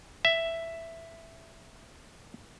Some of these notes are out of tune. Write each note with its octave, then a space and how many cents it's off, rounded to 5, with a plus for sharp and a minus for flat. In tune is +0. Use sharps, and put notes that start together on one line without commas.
E5 +5